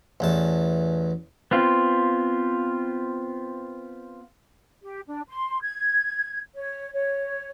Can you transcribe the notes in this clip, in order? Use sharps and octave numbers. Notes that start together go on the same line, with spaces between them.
A1 E2 A5
B3 C4 F4
G4
D4
C6
G#6
C#5
C#5